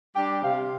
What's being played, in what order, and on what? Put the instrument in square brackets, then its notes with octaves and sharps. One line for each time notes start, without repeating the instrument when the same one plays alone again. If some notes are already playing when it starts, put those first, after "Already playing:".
[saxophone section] G3 D4 G4 [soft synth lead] G5
[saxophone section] C3 [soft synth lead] F5